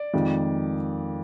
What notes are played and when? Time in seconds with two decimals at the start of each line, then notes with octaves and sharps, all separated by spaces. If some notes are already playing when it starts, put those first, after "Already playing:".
Already playing: D5
0.14 F2 D#3 G#3